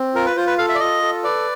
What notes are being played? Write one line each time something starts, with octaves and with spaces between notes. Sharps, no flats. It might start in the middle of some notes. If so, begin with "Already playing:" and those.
Already playing: C4
F4 A#4
B4
F4 C5
B4
A4 F5
E5
D5
F4 D#5
A4
B4 D5